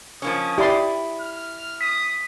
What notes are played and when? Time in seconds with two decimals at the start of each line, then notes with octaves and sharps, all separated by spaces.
0.22 F3 A#3 C#4 D#6
0.58 E4 G4 D5 C6
1.21 F6
1.81 D#6 B6